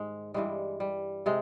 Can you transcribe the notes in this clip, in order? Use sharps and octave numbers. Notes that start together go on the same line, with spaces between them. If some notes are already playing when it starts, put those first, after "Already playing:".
Already playing: G#2 D#3 G#3
G2 E3 G3 G#3
G3
C3 G#3